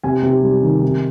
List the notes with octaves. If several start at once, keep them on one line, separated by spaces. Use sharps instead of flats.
C3 G#5
C3
G3
D#3
C3